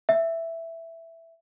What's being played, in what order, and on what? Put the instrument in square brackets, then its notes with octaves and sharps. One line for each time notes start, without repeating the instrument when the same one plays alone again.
[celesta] E5